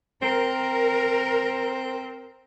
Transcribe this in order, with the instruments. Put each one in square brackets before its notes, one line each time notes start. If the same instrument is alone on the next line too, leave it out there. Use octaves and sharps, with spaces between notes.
[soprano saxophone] C4 [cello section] A#4